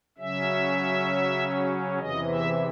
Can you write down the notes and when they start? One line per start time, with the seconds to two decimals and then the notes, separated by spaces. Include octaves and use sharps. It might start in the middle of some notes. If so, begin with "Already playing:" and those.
0.18 C#3 F#3 C#4 E5
1.99 E2 C3 E3 D#5
2.29 E5